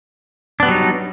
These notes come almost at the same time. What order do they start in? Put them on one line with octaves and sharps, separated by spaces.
D4 B3 G3 F#3 D#4